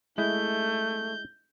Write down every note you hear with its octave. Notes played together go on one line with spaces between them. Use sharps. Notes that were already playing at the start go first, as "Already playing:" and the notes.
G#3 A3 E4 G6